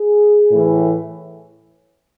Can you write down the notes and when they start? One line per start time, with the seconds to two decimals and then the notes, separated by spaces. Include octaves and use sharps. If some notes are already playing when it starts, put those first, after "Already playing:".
Already playing: G#4
0.50 A2 E3